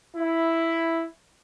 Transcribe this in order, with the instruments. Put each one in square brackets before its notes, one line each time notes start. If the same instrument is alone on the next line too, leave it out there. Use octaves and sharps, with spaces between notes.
[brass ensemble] E4